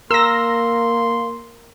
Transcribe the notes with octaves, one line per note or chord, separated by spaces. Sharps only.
A#3 A#4 C6 E6 A#6